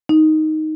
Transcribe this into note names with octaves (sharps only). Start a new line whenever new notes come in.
D#4